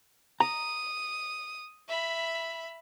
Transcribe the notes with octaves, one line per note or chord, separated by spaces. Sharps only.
A#5 D#6
E5 B5